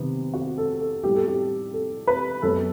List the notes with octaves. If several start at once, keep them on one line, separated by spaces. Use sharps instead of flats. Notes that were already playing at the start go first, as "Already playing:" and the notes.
Already playing: C3 D#3 F#3 B3
F#4
A4
A4
A2 G3 B3 G4
A4
G4
A4
B4
F#2 F#3 B3 A4